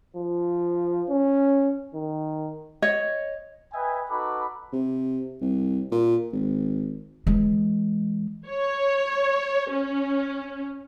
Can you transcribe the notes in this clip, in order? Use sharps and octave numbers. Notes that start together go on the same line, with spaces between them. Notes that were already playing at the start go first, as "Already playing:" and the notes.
F3
C#4
D#3
C#5 D#5
B4 D#5 E5 G5 G#5
D#4 F#4 A4 B4 B5 D6
C3
C2
A#2
G#1
E3 G#3
C#5
C#4